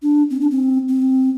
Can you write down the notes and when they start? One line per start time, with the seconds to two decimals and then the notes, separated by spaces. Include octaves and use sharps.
0.03 D4
0.30 C4
0.41 D4
0.51 C4
0.89 C4